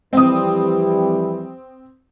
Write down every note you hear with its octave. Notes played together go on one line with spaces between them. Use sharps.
F2 E3 G3 C4 D#6